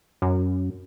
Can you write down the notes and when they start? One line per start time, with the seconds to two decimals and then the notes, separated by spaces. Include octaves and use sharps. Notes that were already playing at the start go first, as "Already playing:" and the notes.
0.22 F#2